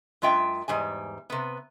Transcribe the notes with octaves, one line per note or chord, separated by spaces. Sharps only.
F#2 G#3 F4 E5 G5
E2 G#2 G3 G#5
C3 B3